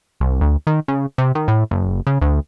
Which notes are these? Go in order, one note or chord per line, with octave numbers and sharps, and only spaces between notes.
C2
D2
D#3
C#3
C3
D#3
A2
F#1
C#3
D2